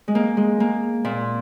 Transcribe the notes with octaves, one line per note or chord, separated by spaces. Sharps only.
G#3
A#3
G#3
A#3
A#2